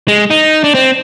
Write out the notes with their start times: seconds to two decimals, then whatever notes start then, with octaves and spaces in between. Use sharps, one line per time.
0.08 G#3
0.30 D#4
0.64 D4
0.74 C4